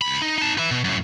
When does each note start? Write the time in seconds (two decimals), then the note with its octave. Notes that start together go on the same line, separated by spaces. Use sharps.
0.02 C#2 B5
0.22 D#4
0.38 D#4 A5
0.58 B4 E5
0.71 B2
0.84 F#2 A2